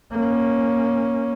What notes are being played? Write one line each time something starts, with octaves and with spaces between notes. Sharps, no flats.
A#3 C#4